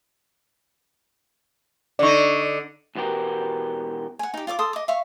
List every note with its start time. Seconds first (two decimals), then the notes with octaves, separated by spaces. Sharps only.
1.99 D3 D#4 D5 C#6
2.95 E2 B2 B3 G4 A#4
4.19 F#5 G#5
4.34 D#4 G4
4.47 F4 D5 E5 D6
4.59 A4 C6 D#6
4.73 D#5 D6
4.88 E5 F5 C#6